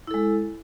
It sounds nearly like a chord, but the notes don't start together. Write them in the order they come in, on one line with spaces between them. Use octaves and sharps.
E4 A4 G#3